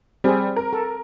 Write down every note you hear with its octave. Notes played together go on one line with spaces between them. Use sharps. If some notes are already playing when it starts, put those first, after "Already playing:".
G3 C4 G#4
A#4
A4